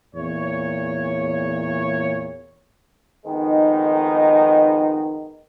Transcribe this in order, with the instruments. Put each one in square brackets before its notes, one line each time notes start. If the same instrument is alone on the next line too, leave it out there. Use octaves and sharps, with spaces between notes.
[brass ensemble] E2 A#2 C#5
[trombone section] F2 D#3 G#3 B3 D#4